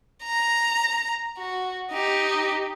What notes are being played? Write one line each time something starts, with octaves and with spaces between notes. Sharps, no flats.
A#5
F#4
D#4 G4